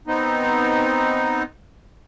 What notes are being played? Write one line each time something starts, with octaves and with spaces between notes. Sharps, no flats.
B3 C4 D#4